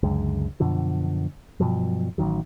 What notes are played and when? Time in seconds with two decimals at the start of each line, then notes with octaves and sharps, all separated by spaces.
0.03 C#2 F#2 D3 G#3
0.60 F#2 B2 D3 F3
1.60 G2 B2 F3 F#3
2.18 A1 A2 D#3 F#3